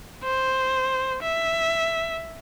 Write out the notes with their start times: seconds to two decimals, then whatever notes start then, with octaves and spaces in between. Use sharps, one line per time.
0.23 C5
1.22 E5